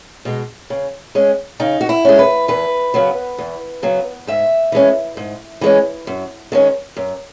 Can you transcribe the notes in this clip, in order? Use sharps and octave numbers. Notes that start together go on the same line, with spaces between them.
B2 G#3
C#3
G#3 C#4
C#3 D#4
F#4
E4
G#3 C#4
B4
E2 B4
C#3 F#3 B3
E2
C#3 F#3 B3
G#2 E5
E3 G#3 C#4
G#2
E3 G#3 C#4
F#2
D#3 G#3 C#4
F#2